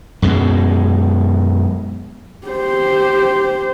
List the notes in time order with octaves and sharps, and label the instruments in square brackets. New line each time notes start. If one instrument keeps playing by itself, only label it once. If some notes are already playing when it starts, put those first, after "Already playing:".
[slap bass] F#2 B2 G#3
[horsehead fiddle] G4 C5